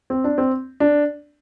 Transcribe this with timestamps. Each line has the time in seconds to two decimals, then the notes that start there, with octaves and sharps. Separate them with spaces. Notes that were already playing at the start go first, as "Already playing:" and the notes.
0.10 C4
0.24 D4
0.38 C4
0.80 D4